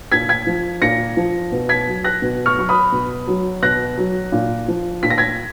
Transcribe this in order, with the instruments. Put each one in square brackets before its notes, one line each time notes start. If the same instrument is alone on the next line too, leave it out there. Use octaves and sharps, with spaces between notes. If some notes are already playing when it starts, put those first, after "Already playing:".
[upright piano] A#2 G#6 B6
G#6 B6
F3
A#2 A#6 C#7
F3
B2
G#6 B6
F#3
F#6 A#6
B2
C#6 F6
F#3 C#6
B5 D#6
B2
F#3
B2 F#6 A#6
F#3
A#2
F3
A#2 B6
A#6
G#6 B6